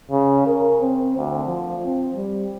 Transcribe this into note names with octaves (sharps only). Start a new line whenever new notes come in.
C#3
A#4
C4
D2
F3
C4
G3